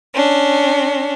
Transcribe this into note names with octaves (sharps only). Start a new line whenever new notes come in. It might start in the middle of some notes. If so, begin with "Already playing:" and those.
C#4 D4